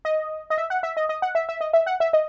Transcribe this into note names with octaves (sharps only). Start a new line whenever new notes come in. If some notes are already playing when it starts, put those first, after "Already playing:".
D#5
D#5
E5
F#5
E5
D#5
D#5
F#5
E5
E5
D#5
E5
F#5
E5
D#5